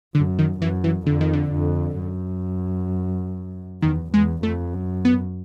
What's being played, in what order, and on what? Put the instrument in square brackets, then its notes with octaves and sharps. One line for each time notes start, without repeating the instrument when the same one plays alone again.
[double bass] F#2 [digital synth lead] D3
[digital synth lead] D#3
[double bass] F#2 [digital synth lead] E3
[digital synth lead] E3
[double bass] F2 [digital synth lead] D3
[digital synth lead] D#3
D3
[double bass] F2
F#2
[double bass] E2 [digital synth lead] D#3
[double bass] E2 [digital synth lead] G#3
[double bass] F2 [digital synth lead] A3
[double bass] F#2
[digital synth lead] B3